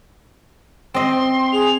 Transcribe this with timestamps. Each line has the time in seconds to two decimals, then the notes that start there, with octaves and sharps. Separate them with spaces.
0.94 C4 D#5 C6
1.52 G#4 F7